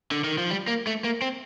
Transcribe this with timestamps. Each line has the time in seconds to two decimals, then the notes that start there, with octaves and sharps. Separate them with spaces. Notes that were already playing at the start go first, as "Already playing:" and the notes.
0.11 D3
0.24 D#3
0.38 F3
0.50 G3
0.68 A#3
0.87 A3
1.04 A#3
1.22 C4